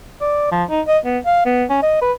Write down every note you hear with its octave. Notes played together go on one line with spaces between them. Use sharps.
D5
F3
D#4
D#5
B3
F5
B3
C#4
D#5
B4